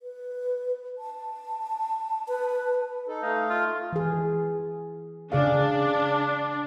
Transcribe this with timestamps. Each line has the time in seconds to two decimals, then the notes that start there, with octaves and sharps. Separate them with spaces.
0.02 B4
0.98 A5
2.28 B4
3.08 D#4 A4
3.23 A3 D#4 F5
3.50 F4
3.93 E3 G#4
5.32 C#3 D4 G#4 F5